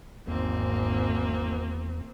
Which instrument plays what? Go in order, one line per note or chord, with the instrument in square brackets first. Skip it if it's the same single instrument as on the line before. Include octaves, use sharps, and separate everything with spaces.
[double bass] G#1 G#2 [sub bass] E2 [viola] A#3 C4